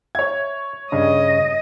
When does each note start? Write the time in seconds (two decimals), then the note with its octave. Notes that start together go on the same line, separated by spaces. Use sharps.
0.15 C#5 E5 G#6
0.92 G2 C#3 D4 D#5